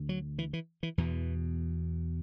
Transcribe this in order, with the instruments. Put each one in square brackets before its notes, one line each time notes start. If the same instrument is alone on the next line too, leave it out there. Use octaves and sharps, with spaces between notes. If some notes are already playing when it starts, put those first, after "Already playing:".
Already playing: [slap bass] D2 D3
F#3
E3
E3
E3
E2 B2 E3